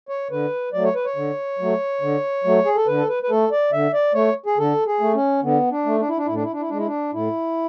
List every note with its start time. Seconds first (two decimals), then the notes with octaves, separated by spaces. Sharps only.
0.09 C#5
0.31 D3 B4
0.73 F#3 A3 D5
0.83 C#5
0.95 B4
1.05 C#5
1.16 D3
1.59 F#3 A3
2.01 D3
2.44 F#3 A3
2.65 G#4
2.76 A4
2.87 D3 B4
2.97 A4
3.08 B4
3.23 B4
3.30 A3 A4
3.51 D5
3.72 D3 E5
3.93 D5
4.14 A3 C#5
4.46 G#4
4.58 D3 A4
4.86 G#4
5.00 A3
5.15 C#4
5.43 D3 B3
5.72 D4
5.86 A3
6.00 D4
6.09 E4
6.18 D4
6.26 A2 E4
6.35 D4
6.43 E4
6.53 D4
6.61 E4
6.69 G#3 D4
6.79 E4
6.86 D4
7.13 A2 E4